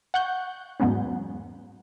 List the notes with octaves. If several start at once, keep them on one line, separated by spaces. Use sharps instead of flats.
F#5 C#6 F#6 G6
E2 G#2 F#3 G#3 B3 C#4